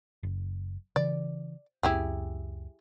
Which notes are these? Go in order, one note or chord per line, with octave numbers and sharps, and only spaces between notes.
F#1
C#3 E3 D5
C#2 F#2 C4 E4 G4 G#4